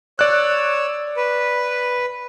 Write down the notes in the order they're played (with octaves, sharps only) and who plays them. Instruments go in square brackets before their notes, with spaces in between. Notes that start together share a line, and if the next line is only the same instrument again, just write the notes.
[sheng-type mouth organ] C#5 E6 [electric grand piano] D5 F#6
[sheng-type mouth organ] B4